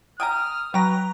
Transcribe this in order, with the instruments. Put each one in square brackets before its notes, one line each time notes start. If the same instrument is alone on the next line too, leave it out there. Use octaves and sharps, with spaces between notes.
[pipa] G5 G#5 A#5 [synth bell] D#6 [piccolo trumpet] F6
[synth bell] F#3 A#5 [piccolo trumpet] B4 [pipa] G5